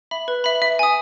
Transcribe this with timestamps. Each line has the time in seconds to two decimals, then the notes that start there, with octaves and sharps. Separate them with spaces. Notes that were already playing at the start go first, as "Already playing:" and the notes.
0.11 E5 B5
0.28 B4
0.44 E5 B5
0.62 E5
0.79 G#5 D#6